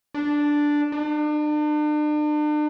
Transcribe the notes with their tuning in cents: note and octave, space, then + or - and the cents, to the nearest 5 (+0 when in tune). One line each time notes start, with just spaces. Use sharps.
D4 +0
D4 +40